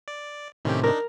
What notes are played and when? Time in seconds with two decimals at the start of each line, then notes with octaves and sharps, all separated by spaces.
0.08 D5
0.65 A2 C3 D#3 C#4 G4
0.84 D4 D#4 A#4